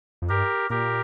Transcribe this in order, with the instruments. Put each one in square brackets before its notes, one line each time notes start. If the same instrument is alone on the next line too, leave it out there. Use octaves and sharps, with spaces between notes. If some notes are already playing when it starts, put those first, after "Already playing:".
[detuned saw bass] F2
[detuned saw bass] G2 [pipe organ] G4 A#4
[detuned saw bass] A#2 [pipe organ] G4 A#4